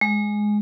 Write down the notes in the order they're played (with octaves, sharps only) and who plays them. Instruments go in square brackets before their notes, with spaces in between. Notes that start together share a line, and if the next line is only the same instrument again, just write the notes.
[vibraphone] G#3